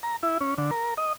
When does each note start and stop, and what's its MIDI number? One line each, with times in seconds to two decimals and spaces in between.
0.03 0.16 82
0.23 0.38 64
0.41 0.54 61
0.58 0.71 50
0.71 0.94 70
0.97 1.13 75